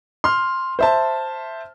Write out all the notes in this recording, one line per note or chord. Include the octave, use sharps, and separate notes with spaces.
C6 F6
C5 E5 A5